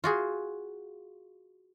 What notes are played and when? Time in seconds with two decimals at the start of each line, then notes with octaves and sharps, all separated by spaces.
0.04 F4 F#4 G#4